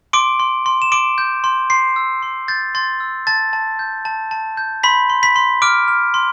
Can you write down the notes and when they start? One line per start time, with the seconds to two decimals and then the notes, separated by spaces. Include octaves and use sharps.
0.13 C6 D6 D7
0.40 C6
0.66 C6
0.82 E7
0.92 C6 D6 D7
1.18 G6
1.44 C6
1.70 C6 C7
1.96 E6
2.23 C6
2.48 G6 A6
2.75 C6 A6
3.00 E6
3.27 A5 A6
3.53 A5
3.79 G6
4.05 A5
4.31 A5
4.57 G6
4.83 B5 C6 B6
5.10 C6
5.23 B5 B6
5.36 C6
5.62 D6 F6 D7
5.88 F6
6.14 C6